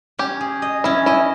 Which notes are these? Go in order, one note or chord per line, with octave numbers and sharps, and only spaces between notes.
C#4 G4
G#4
D#5
C#4 E4
E4 D#5